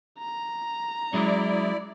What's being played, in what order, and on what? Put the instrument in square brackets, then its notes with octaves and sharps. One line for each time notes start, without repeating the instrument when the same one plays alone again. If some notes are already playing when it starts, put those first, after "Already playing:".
[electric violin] A#5
[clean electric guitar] F#3 G#3 C#4 [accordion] E4 D5